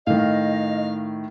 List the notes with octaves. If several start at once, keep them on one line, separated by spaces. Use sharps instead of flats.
A2 D#3 D#5 F5